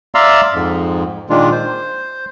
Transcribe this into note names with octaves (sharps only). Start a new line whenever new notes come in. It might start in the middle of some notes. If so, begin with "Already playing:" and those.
D5 E5 F5 A#5 C6 E6
F2 G#2
A#2 D#3 G#3 D4 F4
C5